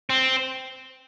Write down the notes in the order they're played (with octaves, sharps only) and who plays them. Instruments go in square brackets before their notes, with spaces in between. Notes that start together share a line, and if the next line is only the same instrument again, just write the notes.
[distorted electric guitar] C4